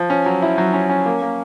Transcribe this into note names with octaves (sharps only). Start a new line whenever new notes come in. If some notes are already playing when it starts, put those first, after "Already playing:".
Already playing: F3
C#4
F#3
E4
F#3
C#4
C#4
A#3
A#3